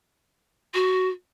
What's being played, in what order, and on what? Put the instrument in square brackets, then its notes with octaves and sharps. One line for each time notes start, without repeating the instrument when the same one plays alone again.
[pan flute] F#4